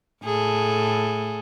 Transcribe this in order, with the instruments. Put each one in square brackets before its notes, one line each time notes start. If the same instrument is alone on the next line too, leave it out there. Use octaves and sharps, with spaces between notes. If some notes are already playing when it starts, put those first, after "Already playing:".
[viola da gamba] A2 G#4 A4